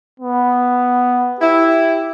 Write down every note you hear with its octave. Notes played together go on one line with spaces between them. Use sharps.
B3
E4 G4